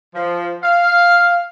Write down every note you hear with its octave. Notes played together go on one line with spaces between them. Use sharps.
F3
F5